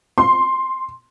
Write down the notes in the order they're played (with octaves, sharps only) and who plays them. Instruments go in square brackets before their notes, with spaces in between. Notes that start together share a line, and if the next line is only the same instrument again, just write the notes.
[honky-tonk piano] C6